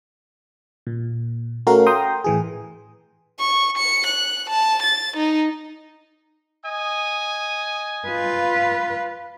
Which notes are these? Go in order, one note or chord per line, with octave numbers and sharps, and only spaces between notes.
A#2
A3 C#4 F#4 A#4 F5
G5 A#5 C6 D#6
A2 E3 G#4
C#6
C#7
F#6
A5
A6
D#4
D#5 G#5 D#6
F4 B4